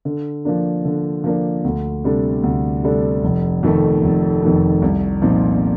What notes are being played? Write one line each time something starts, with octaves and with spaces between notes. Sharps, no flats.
D3
F3 A#3 D4
D3
F3 A#3 D4
D2
C3 G3 D4 A4
D2
C3 G3 D4 A4
F1
F2 D#3 A3
F1
F2 D#3 A3
C2
A#2 F3 C4 D#4